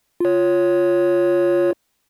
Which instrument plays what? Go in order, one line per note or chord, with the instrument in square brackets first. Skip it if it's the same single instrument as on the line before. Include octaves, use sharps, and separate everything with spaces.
[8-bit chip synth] F4 C#5